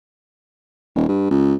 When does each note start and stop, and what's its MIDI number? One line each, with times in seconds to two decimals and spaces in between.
0.95 1.05 27
1.09 1.26 43
1.30 1.54 37